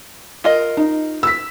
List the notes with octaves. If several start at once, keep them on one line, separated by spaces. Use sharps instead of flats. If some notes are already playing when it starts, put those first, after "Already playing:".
F4 A#4 D#5
D#4
E6 B6